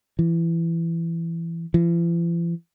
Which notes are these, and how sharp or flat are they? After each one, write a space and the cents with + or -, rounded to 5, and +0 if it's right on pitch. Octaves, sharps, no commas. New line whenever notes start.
E3 +20
E3 +45